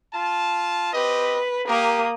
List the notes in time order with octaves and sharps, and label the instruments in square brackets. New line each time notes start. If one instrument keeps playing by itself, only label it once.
[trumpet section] F4 A5
[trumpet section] C4 G4 D#5 [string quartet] B4
[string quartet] A#3 D#6 [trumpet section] G4 A#4